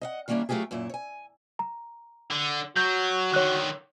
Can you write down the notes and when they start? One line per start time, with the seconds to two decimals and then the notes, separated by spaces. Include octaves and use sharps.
0.01 D#5 F5 F#5
0.28 D#3 G3 A#3 C#4 D4 E4
0.49 F#3 A3 D4 F4 G4 G#4
0.71 F#2 A#2 E4
0.90 C#5 G#5
1.59 A#5
2.31 D3
2.76 F#3 F#4 G6
3.34 D3 D#3 C#5 F#6